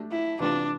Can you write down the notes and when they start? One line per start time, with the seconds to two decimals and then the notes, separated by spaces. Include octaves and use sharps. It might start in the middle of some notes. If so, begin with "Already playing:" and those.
Already playing: A3 D4 G4
0.11 E4
0.40 C3 E3 B3 D4 F4 B4